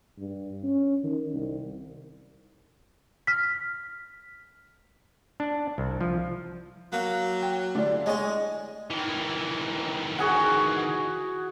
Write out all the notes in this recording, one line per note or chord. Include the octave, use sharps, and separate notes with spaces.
G2
C#4
D#3
C2
F6 B6
D4
C2
F3
F#3 A#3
G5
D3 A3 D4 E4 G4 D5
G#3 A3 G#4 C#5 D#5 G#5
D#3 E3
F#4 G#4 F#5